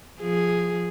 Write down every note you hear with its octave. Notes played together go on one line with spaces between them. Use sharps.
F3 G#4